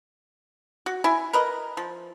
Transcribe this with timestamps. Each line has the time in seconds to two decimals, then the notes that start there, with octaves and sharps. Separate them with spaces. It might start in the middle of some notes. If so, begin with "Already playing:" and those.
0.86 F#4
1.04 E4 G#5
1.33 A#4 B4 D#5
1.77 F3